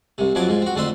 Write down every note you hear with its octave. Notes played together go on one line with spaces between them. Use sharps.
C2 C3
F2 F3 F#3 G#5 D6
G#2 F3
C4 F#4
F2 D3 A3 C5 E5 C6